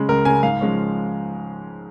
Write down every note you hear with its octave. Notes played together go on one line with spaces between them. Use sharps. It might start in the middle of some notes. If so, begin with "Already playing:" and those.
Already playing: C#3 G#3
C#2 A#4
C#3 G#3 G#5
G#2 F5
F3 G#3 C#4